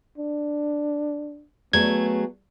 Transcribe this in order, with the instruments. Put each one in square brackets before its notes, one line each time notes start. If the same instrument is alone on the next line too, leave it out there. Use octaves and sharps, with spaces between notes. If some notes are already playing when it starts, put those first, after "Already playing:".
[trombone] D4
[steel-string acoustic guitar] F#3 A3 G#4 [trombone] B3 [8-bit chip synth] G#6